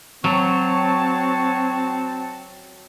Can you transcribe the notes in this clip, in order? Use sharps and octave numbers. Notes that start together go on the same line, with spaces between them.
F#3 C4 F#4 C#5 A5